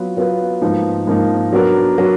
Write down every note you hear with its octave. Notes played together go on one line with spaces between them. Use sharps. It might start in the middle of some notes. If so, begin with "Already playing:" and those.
Already playing: F#3 B3 F4 B4
F#3 B3 F4 B4
G#2 F3 A#3 D#4
G#2 F3 A#3 D#4
F#3 B3 D4 F#4 A#4
F#3 B3 D4 F#4 A#4